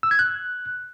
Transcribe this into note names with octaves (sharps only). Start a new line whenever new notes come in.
E6
G#6
F#6